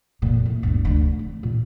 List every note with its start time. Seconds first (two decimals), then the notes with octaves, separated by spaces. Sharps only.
0.22 F2 A#2
0.46 E3
0.63 G1 D2
0.85 D2 D3
1.19 C4
1.43 A#2